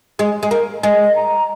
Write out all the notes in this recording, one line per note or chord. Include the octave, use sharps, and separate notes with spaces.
G#3
G#3
A#3
G#3 D#5
A#5